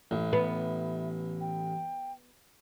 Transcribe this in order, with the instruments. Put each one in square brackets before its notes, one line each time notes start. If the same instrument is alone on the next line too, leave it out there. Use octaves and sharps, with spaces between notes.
[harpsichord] A1 [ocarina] E5
[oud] B3
[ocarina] G5